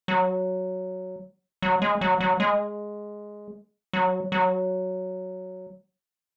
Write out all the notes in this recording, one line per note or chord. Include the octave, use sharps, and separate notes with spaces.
F#3
F#3
G#3
F#3
F#3
G#3
F#3
F#3